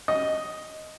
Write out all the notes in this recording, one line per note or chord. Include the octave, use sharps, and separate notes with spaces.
D#5